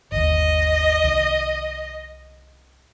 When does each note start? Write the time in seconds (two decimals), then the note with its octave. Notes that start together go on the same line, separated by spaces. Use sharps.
0.12 G1 D#2 D#5
1.04 C2 D#3